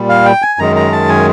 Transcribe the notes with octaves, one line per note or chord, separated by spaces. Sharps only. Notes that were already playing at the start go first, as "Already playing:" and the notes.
Already playing: A#2 G3
F5
G5
G#5
F#2 D#3 G#3 A#5
A#5
A5
G#5